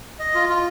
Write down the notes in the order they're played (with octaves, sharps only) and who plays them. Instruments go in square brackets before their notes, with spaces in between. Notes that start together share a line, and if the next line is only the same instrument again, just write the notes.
[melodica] D#5
F4
F4